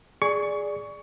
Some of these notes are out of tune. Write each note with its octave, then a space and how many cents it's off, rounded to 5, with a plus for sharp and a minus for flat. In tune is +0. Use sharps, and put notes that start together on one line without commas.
G#4 +0 D5 +0 C#6 +20